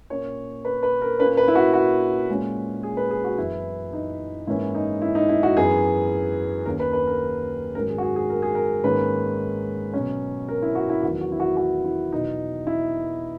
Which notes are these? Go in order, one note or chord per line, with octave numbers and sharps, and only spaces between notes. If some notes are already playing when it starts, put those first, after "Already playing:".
A#2 A#3 C#4 C#5
B4
B4
A#4
A#2 A#3 C#4 B4
B4
E4
F#4
F#4
A#2 G#3 C#4
G#4
B4
G#4
F#4
F#2 E3 B3 E4
D#4
G#2 E3 A#3 C#4 E4
D#4
E4
D#4
E4
F#4
F#2 E3 B3 G#4
D#2 D#3 A#3 C#4 A#4
B4
B4
A#4
G#2 D#3 F#3 C#4 A#4
G#4
F#4
G#4
G#4
A#4
G#4
A#4
G#2 D#3 A#3 C#4 B4
B2 F#3 C#4
A#4
E4
F#4
E4
E2 D#3 F#3 F#4
F#4
E4
F#4
F#4
E4
E2 B2 F#3 D#4
E4